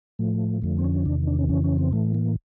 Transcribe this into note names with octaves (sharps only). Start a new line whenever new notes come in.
A2 F3 A3
F2 D3 F3 A3
C4
C#4
E2 C3 D#3 D4
D4
C#4
F2 C#3 E3 C#4
C#4
C4
A2 E3 A3
A#3